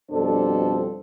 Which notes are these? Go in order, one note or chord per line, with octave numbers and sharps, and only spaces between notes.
F2 B2 G3 D4 A4 C5